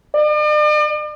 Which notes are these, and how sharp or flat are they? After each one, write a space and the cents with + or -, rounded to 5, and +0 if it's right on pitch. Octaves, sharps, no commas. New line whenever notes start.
D5 +45